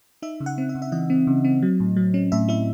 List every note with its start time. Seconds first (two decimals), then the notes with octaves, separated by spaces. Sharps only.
0.22 D#4 E5
0.40 C#3
0.46 F#5
0.58 C4
0.69 E5
0.75 C#3
0.82 E5
0.92 E3 D#5
1.10 C4
1.27 C#3
1.45 C4
1.62 F#3
1.80 A2
1.96 F#3
2.14 C#4
2.32 A2 E5
2.49 E4 E5